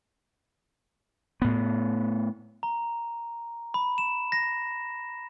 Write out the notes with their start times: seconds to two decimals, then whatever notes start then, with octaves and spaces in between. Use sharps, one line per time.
1.42 A2 B3
2.63 A#5
3.74 B5
3.98 E7
4.32 A#6